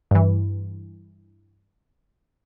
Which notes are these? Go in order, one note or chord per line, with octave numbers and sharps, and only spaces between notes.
G2 E3